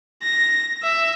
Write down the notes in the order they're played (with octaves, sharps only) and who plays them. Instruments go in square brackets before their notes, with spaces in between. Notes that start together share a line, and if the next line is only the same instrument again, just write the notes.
[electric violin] A#6
E5